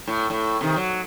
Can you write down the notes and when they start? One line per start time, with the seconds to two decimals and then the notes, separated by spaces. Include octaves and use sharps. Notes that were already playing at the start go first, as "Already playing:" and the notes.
0.07 A2
0.30 A2
0.61 C3 D#3
0.76 F#3